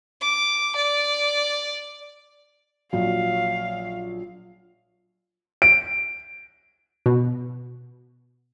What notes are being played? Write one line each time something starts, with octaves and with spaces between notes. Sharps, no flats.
D6
D5
A#1 F#3 F5
D7
B2